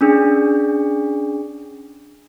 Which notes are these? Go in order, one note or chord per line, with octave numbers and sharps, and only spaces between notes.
C#4 D4 G#4